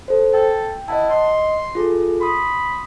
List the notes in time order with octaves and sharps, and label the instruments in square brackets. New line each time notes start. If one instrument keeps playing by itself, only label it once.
[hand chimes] A4 C5
[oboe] A4 [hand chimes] G5
[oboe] E4 [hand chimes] D#5 F#5 A5
[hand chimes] D#5 [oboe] C6
[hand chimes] F4 G#4 A4
[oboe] B5 [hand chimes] C6 D#6